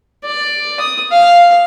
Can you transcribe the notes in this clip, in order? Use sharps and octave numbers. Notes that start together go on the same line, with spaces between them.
D5
D#6
F5